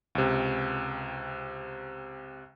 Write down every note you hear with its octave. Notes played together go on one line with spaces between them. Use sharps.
C#2 C3